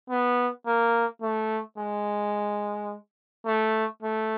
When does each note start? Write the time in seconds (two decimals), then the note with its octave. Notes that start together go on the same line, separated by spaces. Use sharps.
0.10 B3
0.67 A#3
1.22 A3
1.78 G#3
3.46 A3
4.03 A3